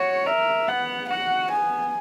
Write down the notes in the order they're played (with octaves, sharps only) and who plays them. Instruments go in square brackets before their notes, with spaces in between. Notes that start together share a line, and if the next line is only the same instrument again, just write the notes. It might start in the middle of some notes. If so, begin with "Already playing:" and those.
Already playing: [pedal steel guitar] F#4 [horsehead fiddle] C#5
[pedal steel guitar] A#4 [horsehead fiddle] E5
[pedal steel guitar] B3 [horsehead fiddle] F#5
[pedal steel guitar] F#4 [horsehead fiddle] F#5
[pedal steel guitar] B3 [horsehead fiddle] G#5